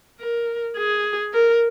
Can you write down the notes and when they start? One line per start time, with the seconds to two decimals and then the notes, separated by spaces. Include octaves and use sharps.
0.20 A#4
0.77 G#4
1.34 A#4